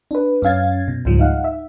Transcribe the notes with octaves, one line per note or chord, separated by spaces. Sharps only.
D4 B4
F#2 C#4 F5 G#6 A6
B2
C#2 G#2 F3 G3
D#4 F5 F#5
E5